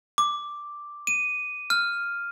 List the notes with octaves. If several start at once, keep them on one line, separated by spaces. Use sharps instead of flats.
D6
D#7
F6